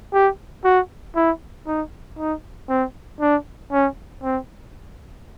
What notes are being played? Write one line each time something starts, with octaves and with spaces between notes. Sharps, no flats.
G4
F#4
E4
D#4
D#4
C4
D4
C#4
C4